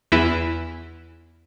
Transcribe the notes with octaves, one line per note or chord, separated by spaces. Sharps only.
E2 E3 E4